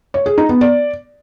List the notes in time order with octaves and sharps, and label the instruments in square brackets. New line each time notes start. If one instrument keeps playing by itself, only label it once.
[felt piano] C#5
G#4
D#4
B3
D5